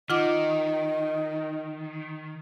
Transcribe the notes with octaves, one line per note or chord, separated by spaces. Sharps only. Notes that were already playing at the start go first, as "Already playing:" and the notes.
D#3 F4 D#5 F#5 D6